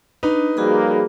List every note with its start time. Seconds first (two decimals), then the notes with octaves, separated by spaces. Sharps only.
0.23 D4 D#4 B4
0.57 F3 G3 A#3 F#4 G#4 B5